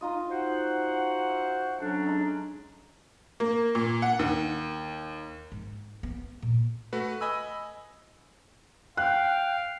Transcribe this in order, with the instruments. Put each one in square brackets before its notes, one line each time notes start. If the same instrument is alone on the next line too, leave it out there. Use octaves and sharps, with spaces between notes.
[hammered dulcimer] D#4 F4 D#5
[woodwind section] F#4 C5 F#5
[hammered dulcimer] E5
[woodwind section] F#3 C#4 D4 [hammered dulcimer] A4
[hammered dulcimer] G#3 D#4
[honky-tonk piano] A#3
A#2
F#5
D#2
[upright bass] G#2
B3
A#2
[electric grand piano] A3 F#4 B4
D#5 G#5 B5 E6
[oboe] F5 [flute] G5 [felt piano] F#6